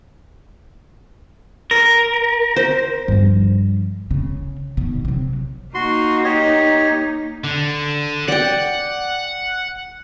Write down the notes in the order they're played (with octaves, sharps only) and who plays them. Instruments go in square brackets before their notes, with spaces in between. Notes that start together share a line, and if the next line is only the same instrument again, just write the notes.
[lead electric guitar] A#4
[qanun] C5
[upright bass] G2 F3
C#3
B2 D#3
C3 F#3
[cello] A#3 D#4 [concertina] F#4 C6
[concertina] G4 C#5 D#5
[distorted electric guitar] D3
[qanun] D5 G5 [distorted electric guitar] F#5